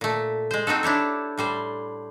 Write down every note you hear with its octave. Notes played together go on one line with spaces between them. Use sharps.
A#2 A3
G#3 C5
C4 D#4 F#4 A4
D4 E4 G4 C#5
A2 G3 C5